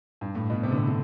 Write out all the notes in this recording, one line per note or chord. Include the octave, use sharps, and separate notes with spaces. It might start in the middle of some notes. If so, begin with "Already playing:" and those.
G2
A2
B2
C3
D3
C3
D3